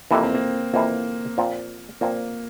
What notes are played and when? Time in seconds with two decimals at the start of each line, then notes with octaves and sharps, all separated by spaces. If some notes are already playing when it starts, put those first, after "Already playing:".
0.11 F2 C3 E3 A#3
0.23 C4
0.34 A#3
0.73 F2 C3 E3 A#3
1.38 A#2 F3 C4
2.01 A#2 F3 A#3 C4